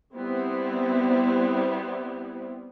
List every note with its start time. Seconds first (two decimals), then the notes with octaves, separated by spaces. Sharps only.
0.16 G3 B3 C4 E4